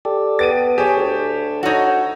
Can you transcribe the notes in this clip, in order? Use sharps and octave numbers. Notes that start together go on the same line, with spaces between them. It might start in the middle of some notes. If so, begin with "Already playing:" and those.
G4 A4 D5
B3 A6 D7 D#7
G4 G#4 C#5 A5
D2
D#4 F#4 A4 C#5